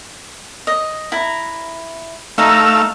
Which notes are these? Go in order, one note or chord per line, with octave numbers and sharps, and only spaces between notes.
D#5
E4 A#5
A3 D#4 E5 F5 A#5 E6